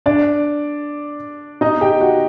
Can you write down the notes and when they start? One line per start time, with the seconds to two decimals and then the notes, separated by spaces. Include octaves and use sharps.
0.06 D4 D5
1.61 D#4 D#5
1.81 G4 G5
2.00 F#4 F#5